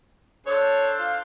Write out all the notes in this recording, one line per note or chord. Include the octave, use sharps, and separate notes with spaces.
D4 A4 C5 C#5
F4